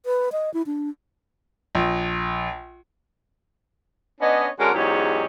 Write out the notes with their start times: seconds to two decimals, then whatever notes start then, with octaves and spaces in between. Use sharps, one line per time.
0.06 B4
0.32 D#5
0.54 E4
0.66 D4
1.75 A#1
4.21 B3 C#4 D4 C#5 D#5
4.59 D3 G#3 C#4 D4 F#4 A#4
4.74 E2 G#2 F#3 C#4 G4 D#5